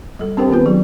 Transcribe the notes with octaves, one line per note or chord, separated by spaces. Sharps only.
G3 A4
C4 D4 G4 A#4 C5 G5
D#3 B3 C4 F4 B4
F#3 G#4